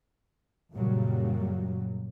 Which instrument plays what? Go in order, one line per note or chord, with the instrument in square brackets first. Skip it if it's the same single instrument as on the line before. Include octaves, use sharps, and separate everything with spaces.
[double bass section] F#2 A#2 C#3 F#3 G3